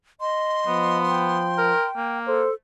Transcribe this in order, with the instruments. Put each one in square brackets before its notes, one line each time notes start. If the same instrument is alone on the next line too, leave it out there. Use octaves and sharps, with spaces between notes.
[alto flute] D#5 [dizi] C6
[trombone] F3 [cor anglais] B3
[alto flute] G5
[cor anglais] A#4
A#3
[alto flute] A4 [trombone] C5